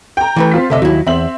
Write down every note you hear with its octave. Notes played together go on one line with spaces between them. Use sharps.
G5 A#5
E3 A3 B4
C4 F4 B6
D2 C3 A4 D#5 E5
D#2 F#3 E4
E2 C4 E5 F#7